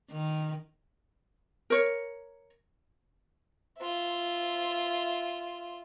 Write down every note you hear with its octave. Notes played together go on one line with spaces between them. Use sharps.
D#3
A#4 C#5
F4 E5